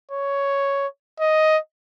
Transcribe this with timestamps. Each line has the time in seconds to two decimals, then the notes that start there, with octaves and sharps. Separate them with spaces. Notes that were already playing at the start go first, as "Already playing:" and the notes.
0.11 C#5
1.20 D#5